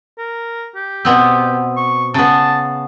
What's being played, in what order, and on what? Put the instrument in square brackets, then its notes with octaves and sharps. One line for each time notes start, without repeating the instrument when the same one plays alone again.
[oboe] A#4
G4
[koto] B2 B3 C4
[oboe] C#6
[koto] C#3 B3 [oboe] A5